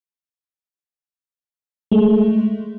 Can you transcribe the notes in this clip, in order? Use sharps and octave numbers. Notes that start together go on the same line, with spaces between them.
G#3 A3